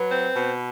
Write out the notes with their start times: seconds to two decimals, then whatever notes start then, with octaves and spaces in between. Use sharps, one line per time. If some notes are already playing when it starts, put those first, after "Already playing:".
Already playing: F#3 B4
0.10 C4
0.34 B2